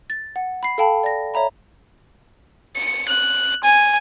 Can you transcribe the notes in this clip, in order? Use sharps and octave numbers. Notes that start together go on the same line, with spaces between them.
A6
F#5
B5 C7
A4 F5 G5 A5 B5
D5 A#6
C#5 E5 A#5 B5
C#7
F#6
G#5